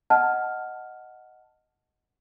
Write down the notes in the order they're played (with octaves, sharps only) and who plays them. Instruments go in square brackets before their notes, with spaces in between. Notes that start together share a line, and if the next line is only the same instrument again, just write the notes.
[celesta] D#5 F#5 A5 F6